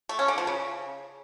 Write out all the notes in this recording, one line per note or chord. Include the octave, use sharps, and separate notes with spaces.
A3
C#4
D3
F3
C#3